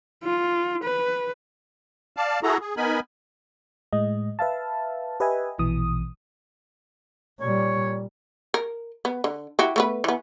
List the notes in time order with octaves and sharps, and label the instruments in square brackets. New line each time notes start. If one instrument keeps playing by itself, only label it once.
[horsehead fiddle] F4
B4
[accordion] D5 F5 A5
E4 F#4 G#4 A4 A#5
G#4
B3 D#4 A#4 G#5 B5
[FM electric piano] A2 G#3 D#5
B4 E5 F5 A5
G4 B4 D#5 E5 G#5
A#1 B2 E3 D#6
[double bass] A#2 G3 [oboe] C#5
[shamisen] A#4
B3
D3
E4 F#4 G4
A3 B3 B4
E3 B3